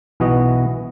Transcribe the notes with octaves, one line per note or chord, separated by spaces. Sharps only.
B1 E3 B3 F#4 D#5